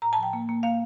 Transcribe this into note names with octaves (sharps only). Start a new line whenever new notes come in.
A2 A#5
A5
F3
G5
A#3
A#3
A#3 F5